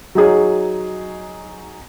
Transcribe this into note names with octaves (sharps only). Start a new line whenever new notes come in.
F#3 D#4 G#4 C#5